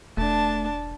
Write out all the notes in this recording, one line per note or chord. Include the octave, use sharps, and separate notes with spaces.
E1 A3 D4 A5